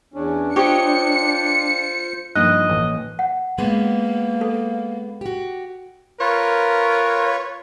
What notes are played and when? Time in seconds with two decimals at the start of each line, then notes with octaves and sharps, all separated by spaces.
0.14 E2 C#4 D4
0.56 F4 G4 C5 C#5 D#5 C#7
2.36 G2 F3 A#3 D#4 D#5 F#6
2.70 A1
3.19 F#5
3.58 G#3 A#3 B3
4.41 A4
5.21 F#4 G4
6.20 F4 A#4 B4 C#5